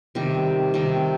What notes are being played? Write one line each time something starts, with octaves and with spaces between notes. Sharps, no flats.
C3 D#3 G3
C3 D#3 G3